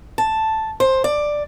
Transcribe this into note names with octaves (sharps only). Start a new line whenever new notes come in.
A5
C5
D5